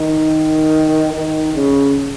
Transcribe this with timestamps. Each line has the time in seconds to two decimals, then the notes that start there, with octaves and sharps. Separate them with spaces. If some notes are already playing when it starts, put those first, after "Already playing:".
Already playing: D#3
1.14 D#3
1.54 C#3